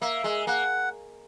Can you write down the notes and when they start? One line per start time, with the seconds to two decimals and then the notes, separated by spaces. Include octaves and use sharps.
0.02 A#3 E5
0.24 G#3
0.47 A#3 F#5